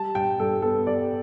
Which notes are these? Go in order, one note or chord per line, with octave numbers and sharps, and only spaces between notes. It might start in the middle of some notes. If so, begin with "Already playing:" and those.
Already playing: G3 A5
G2 G5
G2 A4
B3 A4
G3 D5